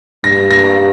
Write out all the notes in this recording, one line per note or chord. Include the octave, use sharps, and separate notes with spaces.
G2 A#6
A#6